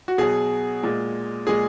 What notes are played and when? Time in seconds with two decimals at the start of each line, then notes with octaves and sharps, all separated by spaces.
0.08 F#4
0.18 B2 F#3 G#4
0.83 A#2 G#3
1.47 A#2 G#3 G#4